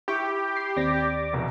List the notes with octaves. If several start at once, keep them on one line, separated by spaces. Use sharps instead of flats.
E4 G4 C#6
C7
D#2 C4 D5 A#6
F1 E2 B2